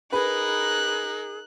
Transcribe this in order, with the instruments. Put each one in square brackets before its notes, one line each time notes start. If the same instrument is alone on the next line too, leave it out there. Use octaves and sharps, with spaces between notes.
[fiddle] D#4 A#4 [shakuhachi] G#4 [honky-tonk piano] B4 [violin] F#6